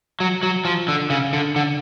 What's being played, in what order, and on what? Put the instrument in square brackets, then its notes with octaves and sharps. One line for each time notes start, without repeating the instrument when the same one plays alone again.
[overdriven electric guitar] F#3
F#3
F3
D3
C#3
D3
D3